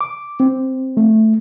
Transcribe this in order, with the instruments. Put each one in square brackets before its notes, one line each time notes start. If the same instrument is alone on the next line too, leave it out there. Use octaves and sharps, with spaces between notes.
[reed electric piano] D6
C4
A3